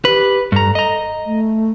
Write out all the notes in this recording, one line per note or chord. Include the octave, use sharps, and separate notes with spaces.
G4 B4
G2 A4 A#5
D#5 A#5
A3